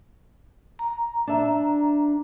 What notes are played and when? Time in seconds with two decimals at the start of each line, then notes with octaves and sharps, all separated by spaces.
0.79 A#5
1.27 D4 E5